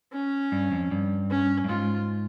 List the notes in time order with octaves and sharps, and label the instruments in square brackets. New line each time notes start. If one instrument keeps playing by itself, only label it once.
[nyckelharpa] C#4
[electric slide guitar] G2
F2
G2
[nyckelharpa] C#4
[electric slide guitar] G2
[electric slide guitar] G#2 [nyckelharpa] F4